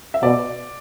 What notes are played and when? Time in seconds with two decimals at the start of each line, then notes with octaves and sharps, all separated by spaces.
0.14 E5
0.23 B2 D5